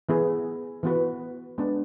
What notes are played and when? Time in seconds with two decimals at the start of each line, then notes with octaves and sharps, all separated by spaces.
0.09 E3 B3 E4 G#4
0.83 E3 B3 F#4 B4
1.58 G#3 B3 D4